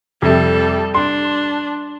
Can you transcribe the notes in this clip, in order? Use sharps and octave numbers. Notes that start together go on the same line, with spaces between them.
F2 C3 G3 A4
D4 C6